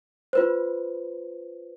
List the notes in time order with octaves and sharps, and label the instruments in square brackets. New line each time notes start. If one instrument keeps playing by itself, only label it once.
[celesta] F4 B4 C5